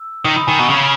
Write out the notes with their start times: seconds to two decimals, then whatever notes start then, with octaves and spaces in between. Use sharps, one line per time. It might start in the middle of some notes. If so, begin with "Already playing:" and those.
Already playing: E6
0.25 D#3 D#6
0.36 B5
0.47 D#3 G#5
0.58 B2 A#5
0.70 C#3 C#6